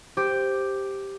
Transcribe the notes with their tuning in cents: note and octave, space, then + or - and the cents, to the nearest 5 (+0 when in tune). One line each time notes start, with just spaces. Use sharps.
G4 +0 C5 +0